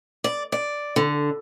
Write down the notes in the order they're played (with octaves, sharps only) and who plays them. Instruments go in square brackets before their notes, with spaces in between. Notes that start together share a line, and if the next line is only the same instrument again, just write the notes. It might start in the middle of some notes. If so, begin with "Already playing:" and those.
[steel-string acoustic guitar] D5
D5
D3